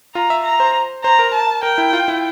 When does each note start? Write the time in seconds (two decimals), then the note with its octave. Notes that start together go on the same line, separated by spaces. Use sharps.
0.15 F4 A#5
0.30 E5
0.45 A#5
0.60 C5
1.04 C5 A#5
1.19 A#4
1.34 A5
1.63 A#4 G5
1.78 E4
1.93 F4
2.08 E4